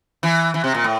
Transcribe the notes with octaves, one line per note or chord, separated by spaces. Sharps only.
E3
E3
C3
A#2
A2